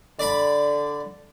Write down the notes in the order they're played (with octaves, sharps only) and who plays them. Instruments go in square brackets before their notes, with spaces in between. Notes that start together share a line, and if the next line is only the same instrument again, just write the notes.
[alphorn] D3 [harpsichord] D5 B5